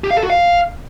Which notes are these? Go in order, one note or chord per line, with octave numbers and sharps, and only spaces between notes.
G4
F5
A4
F#4
F5